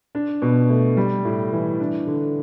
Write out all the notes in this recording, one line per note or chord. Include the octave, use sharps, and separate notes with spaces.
D4
B2
A3
G3
A2
E3
D4
D3